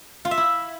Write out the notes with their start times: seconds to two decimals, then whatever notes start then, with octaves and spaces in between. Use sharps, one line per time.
0.25 F4
0.31 E5
0.37 E4